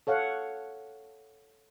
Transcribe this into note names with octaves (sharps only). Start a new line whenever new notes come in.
A4 C#5 F5 F#5